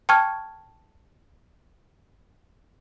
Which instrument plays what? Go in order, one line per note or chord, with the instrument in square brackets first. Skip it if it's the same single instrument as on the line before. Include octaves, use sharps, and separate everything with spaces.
[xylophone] G5 A5 C#6 F6 G#6